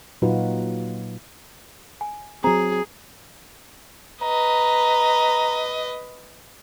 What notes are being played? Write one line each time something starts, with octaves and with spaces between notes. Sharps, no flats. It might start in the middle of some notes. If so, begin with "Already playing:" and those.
A#2 F#3 D#4 F4 F#4 B4
G#5
F#3 C4 G#4 A#5
B4 D#5 A#5